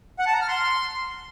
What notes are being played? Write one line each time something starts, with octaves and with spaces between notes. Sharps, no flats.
F#5
A5
A#5
F6
C6